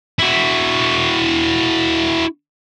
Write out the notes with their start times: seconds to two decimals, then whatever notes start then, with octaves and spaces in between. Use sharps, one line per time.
0.19 E4 F#4